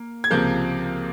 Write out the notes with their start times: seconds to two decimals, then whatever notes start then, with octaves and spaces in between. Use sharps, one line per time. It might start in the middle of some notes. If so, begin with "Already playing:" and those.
Already playing: A#3
0.24 G#6
0.31 C#2 C3 F3 A#3 G6